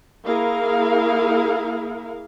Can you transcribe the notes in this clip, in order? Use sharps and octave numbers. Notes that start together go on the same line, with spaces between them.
A#3 E4 G#4 A#4 F5